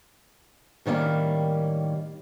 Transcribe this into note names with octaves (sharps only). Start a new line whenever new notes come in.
A2 D#3 G3 A#3 C#4